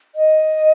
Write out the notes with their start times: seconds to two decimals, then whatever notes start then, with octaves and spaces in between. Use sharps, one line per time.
0.15 D#5